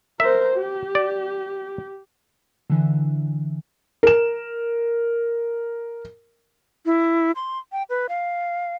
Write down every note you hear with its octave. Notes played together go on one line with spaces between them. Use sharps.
A#4 C5 E5
G4
D5
D3 E3
A#4 E7
E4
C6
G5
B4
F5